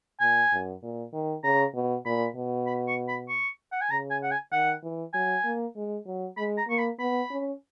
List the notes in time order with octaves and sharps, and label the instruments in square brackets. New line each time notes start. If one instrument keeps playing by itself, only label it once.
[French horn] A#2 [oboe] G#5
[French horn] F#2
A#2
D#3
[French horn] C#3 [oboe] A#5
[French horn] B2
[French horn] A#2 [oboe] B5
[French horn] B2
[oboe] B5
C#6
B5
C#6
F#5
G#5
[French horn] C#3 [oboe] A#5
[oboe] G#5
F#5
G#5
[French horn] D#3 [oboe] F#5
[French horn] E3
[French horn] F#3 [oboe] G#5
[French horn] A#3
G#3
F#3
[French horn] G#3 [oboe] B5
[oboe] A#5
[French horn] A#3 [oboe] C#6
[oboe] B5
[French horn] B3 [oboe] B5
[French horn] C#4